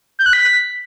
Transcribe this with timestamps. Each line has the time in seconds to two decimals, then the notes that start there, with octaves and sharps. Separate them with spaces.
0.19 G6
0.26 F#6
0.33 B6